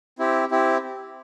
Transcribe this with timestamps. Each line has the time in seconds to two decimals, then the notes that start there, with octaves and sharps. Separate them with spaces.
0.19 C4 E4 G4
0.51 C4 E4 G4